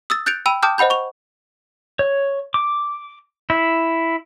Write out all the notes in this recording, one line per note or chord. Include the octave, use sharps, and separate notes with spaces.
D#6 E6 A6
F#6 G6 A6 C#7 D7 F7
G5 B5 E6 D#7
G5 A5 D6 D#6 F6 G6
C5 D#5 F#5 B5 G6
C#6 F7
C#5
D6
E4